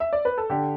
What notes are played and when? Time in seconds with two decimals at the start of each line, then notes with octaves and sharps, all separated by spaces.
0.00 E5
0.13 D5
0.25 B4
0.38 A4
0.50 D3 G4